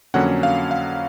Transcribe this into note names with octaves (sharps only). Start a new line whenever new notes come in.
F2 D3 F#3 A#3 C#4 F#5
F5
F5